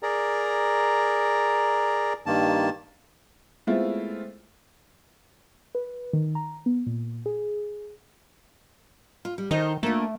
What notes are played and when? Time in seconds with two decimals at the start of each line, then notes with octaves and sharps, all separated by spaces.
0.03 G#4 A#4 D5 A#5
2.26 G2 D#3 A#3 A5
3.67 G#3 A3 B3 C4 E4 F4
5.75 B4
6.13 D#3
6.35 A#5
6.66 B3
6.86 A#2
7.26 G#4
9.25 F4
9.38 G3
9.51 D#3 D#4 A4 C5
9.83 A3 A#3 D4 F4